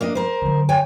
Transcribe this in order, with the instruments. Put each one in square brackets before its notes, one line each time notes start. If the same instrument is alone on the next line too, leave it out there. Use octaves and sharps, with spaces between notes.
[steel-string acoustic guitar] A#3 D4 D#5
A#4 C5
[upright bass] D3 F#3
[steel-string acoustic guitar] C#5 G5 G#5